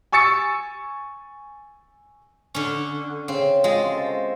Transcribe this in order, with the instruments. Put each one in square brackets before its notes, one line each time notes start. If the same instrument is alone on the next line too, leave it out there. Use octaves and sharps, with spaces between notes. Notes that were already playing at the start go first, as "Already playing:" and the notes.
[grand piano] G#5 C#6 E6 A6 C#7
[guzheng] D3 C#4
[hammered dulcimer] C#3 [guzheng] C4
[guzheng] G#3 [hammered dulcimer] F4 F#4 E5
[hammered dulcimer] A4 C5